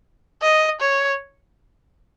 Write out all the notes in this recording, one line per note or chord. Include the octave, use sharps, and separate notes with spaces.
D#5
C#5